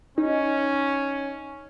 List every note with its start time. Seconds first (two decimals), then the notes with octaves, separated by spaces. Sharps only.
0.18 C#4 D#4